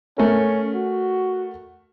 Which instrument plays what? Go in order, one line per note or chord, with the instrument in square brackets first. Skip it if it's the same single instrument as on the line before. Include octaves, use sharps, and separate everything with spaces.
[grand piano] A3 A#4 [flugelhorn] C#4
[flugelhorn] F#4